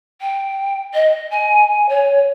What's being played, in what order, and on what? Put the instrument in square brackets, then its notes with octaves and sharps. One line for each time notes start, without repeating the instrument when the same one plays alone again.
[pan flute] G5
D#5
G#5
C#5